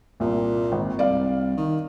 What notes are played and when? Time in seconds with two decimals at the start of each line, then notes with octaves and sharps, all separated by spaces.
0.20 C2 A#2
0.72 G#1
0.99 C2 D5 F5
1.57 D#3